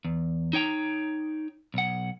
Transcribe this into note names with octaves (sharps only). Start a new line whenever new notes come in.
E2
D#4 C#5 G5 A#5
B1 F#5